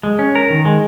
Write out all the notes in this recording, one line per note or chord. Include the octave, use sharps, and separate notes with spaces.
G#3
C#4
A#4
D#3
G#3